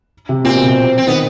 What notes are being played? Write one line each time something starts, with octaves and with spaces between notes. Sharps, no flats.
C3
A#2 C4
B2
C3
C4
D#3 B3